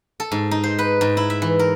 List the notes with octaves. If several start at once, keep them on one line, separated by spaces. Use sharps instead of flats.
A4
G#2
D#4
C5
B4
G#2
E4
E5
E3
A#4